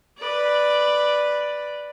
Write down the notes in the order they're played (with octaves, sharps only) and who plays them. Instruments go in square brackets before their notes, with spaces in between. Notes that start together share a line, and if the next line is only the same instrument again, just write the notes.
[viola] B4 D5